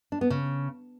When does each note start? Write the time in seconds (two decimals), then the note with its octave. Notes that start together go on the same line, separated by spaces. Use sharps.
0.12 D4
0.21 B3
0.30 C#3